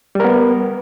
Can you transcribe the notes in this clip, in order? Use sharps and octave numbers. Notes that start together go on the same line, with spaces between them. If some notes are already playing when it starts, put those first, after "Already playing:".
G3 B3 A#4